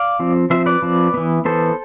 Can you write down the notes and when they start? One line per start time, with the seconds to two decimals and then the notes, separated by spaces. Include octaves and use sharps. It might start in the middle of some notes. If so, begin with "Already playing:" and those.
Already playing: D5 F5
0.20 F3 C4
0.50 F3 C4 C5 E5
0.66 B4 D5
0.82 F3 C4
1.14 E3 B3
1.45 E3 B3 A4 C5